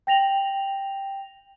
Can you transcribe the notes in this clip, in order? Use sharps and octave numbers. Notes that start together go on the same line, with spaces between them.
G5 A#6 F7 F#7